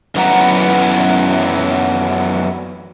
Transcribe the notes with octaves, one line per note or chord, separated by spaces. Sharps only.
F#2 E3 F#3 B3 F#5 A#5